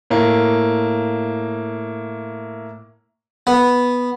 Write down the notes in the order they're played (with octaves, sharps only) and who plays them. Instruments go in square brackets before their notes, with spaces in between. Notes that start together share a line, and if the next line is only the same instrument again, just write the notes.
[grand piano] A2 A#3
[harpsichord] B3